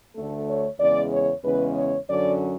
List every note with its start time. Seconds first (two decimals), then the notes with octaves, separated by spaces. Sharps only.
0.15 D2 D3 A3 A4
0.48 C#5
0.79 E2 C#3 G#3 D5
1.12 C#5
1.44 E2 C#3 G#3 C#4 B4
1.76 C#5
2.09 F#2 D3 F#3 C#4 D5